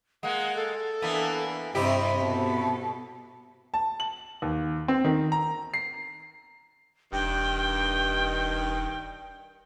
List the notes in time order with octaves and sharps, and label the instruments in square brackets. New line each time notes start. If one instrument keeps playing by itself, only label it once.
[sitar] G#3 A#3 [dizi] F#5
[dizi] A4
[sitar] E3 A#3 B3 [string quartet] D4
[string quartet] G2 C4 D#5 [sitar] C3 E4 G4 [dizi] B5
[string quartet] B2 A4
[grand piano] A5
F#7
D#2
C4
D#3
A#5
C7
[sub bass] E1 [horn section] G2 D#3 [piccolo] G5